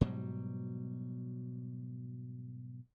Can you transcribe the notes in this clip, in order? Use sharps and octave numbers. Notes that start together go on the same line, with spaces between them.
G#2 B2 F#3 G3